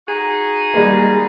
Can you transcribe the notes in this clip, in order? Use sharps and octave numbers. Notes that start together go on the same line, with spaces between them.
D#4 F#4 G#4
G3 G#3 A#3